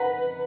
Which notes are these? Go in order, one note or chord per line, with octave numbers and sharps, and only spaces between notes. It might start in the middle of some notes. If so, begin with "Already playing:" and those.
Already playing: B4 F#5 A#5